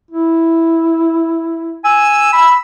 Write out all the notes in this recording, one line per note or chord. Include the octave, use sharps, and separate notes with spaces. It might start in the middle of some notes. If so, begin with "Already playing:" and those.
E4
G#5 E6
B5